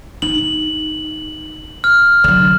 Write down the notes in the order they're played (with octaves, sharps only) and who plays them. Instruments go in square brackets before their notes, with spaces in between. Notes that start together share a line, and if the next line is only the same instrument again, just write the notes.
[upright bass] D#4 [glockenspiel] F#7
[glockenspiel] F6
[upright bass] D3 F#3